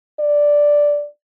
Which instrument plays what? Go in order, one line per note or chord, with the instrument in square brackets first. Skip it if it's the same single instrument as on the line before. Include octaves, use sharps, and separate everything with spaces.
[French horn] D5